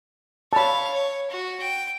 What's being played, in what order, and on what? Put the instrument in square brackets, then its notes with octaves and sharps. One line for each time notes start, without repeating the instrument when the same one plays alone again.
[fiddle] C#5 F5 [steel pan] A5 B5
[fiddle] C#5
F#4
G5